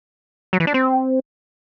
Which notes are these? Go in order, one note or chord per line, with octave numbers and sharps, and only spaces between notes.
F#3
E3
D4
C4